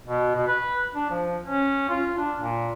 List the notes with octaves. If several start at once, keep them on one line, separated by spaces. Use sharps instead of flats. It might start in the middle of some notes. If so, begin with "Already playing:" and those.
B2
B2
B4
D4
F3
C#4
F4
D4
A#2